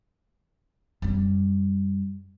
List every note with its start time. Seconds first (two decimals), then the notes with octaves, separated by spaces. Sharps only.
1.02 F#2 G3